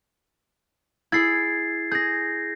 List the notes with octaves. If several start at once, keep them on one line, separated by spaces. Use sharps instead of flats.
E4 G#4 G#6 A6 C7
G#4 G6 A#6